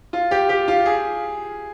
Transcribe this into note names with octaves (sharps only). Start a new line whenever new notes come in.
F4
G4
G4
F4
G#4